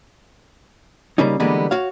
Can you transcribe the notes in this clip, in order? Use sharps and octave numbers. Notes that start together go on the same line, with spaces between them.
C#3 G3 A#3 C#4 D#4
D3 E3 G3 G#3 A#3 B3
F#4 C#5 F5